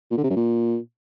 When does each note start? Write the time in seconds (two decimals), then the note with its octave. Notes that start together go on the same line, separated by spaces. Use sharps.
0.11 A#2
0.17 D3
0.24 C3
0.30 F#2
0.36 A#2